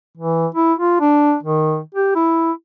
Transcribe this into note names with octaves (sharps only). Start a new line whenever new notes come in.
E3
E4
F4
D4
D#3
G4
E4